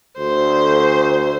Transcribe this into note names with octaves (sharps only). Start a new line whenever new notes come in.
D2 C5